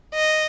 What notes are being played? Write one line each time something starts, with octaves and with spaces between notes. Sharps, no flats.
D#5